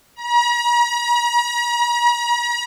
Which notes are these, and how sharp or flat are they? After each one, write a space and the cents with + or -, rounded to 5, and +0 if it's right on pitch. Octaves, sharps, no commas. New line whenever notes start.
A#5 +45